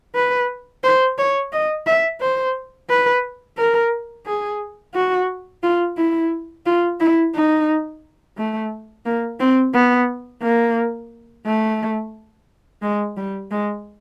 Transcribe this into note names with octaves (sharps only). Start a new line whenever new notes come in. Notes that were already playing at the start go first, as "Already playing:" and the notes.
B4
C5
C#5
D#5
E5
C5
B4
A#4
G#4
F#4
F4
E4
F4
E4
D#4
A3
A#3
C4
B3
A#3
A3
G#3
G3
G#3